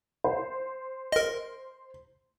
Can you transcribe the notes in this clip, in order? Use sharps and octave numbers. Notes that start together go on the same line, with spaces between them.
C5
A#4 D#5